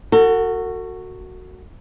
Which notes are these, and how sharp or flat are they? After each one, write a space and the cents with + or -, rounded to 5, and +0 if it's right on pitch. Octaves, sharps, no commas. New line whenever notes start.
F#4 +0 A4 +40